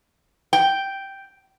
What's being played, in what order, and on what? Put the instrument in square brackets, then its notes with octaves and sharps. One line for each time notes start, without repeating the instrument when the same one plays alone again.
[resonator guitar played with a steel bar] G5